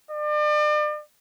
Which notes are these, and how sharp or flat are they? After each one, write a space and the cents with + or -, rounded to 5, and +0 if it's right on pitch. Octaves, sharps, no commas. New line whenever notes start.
D5 +40